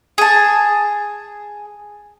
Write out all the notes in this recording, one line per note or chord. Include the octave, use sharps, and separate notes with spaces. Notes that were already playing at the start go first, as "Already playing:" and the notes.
G#4 A5